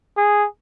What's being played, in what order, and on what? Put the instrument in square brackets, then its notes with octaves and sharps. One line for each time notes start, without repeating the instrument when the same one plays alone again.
[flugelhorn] G#4